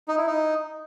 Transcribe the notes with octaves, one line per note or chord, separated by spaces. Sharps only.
D#4
E4
D#4